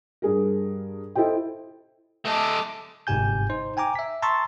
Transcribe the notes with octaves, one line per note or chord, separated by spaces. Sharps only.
G2 G#4 A#4
E4 A4 C5 D#5 G5
A3 D#5 A5 D6
G1 G#2 C3 G4 G#5 G6
D#4 C5
G5 G#5 A#5 D6
E5 B6
A5 A#5 C6 C#6 E6 A6